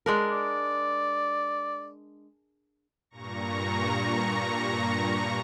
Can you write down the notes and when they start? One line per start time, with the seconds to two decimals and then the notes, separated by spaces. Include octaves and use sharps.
0.06 G#3 D4 A#4
0.32 D5
3.10 G2 A#2 A#5 C#6 A#6